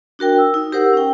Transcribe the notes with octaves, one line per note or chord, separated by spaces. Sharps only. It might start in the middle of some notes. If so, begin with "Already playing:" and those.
D4 F#4 A#4 G5
E6
D#4
G4 A#4 C5 F#5 E6
C#4 G5